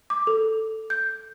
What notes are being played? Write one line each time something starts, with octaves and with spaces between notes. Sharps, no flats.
D6
A4
G6